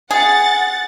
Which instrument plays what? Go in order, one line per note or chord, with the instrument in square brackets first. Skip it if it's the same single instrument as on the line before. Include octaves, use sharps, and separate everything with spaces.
[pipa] G#4 [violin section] F#5 A6